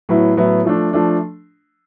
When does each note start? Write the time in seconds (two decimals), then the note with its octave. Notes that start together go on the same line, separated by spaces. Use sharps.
0.09 A2 F#3 B3 E4
0.37 A2 F#3 B3 E4
0.65 F3 A3 D4
0.93 F3 A3 D4